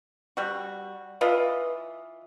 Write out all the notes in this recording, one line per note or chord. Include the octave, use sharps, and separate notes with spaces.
G3 F#4
E3 F4 B4 D#5